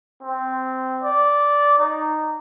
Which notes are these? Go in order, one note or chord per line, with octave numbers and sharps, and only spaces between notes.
C4
D5
D#4